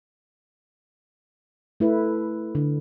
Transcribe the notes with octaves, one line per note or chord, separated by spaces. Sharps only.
A3 E4 B4
D3